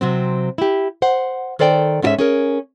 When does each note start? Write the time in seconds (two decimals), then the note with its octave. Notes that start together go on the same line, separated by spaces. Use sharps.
0.01 C3 F#3 C4
0.58 E4 G4
1.02 C5 F#5
1.59 D#3 A4 C5 D5 F#5 G5
2.02 G#2 C#4 F4 F#4 G#4 E5
2.19 C#4 G#4 A#4